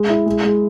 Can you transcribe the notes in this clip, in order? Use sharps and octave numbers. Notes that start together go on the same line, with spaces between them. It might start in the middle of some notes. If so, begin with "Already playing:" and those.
Already playing: G#3
E4
G#3
G#3